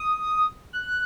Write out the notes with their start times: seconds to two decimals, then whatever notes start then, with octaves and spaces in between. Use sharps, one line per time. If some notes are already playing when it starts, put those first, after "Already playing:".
Already playing: D#6
0.73 F#6